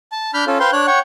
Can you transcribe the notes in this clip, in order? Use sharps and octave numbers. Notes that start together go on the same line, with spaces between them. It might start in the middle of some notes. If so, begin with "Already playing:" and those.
A5
D4 B5 F6 G6
C#4 F4 A4
B4 C5 F5 G5 C6
D4 C#5 F#6
C#5 F#5 G5 C#6